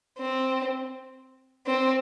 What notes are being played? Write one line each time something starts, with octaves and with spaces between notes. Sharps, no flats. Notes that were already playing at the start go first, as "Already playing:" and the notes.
C4
C4